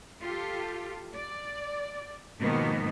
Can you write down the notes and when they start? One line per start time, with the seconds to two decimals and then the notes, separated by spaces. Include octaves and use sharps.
0.23 F4 G4 A4
1.13 D5
2.40 G#2 B2 D#3 F3 A#3 B3